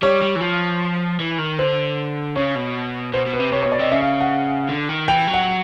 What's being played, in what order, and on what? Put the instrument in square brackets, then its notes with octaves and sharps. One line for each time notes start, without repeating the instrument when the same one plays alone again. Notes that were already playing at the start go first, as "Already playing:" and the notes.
[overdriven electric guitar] G3 [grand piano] C#5
[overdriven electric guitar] G3
E3
F3
E3
D#3
[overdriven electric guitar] D3 [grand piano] C5
[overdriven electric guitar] C#3 [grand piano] C#5
[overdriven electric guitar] B2
[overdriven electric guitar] B2 [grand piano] C5
[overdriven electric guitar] B2
[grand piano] B4
[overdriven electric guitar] C3
[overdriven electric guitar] C3 [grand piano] C#5
[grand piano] C#5
[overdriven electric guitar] B2
[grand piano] D5
[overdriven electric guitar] C3 [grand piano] D#5
[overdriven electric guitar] C#3 [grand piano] E5
[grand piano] F5
F#5
[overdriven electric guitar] D3
D#3
[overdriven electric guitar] E3 [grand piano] G5
[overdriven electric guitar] F#3
[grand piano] F#5